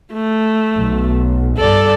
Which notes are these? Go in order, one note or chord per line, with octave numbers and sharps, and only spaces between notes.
A3
B1
G2 A4 D5